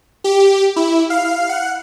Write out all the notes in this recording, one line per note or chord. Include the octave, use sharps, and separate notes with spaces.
G4
E4
F5
F#5